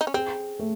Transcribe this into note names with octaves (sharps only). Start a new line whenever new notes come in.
D#4
C#4
C4 G#4
A3